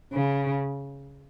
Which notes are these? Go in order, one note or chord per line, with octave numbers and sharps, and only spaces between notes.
C#3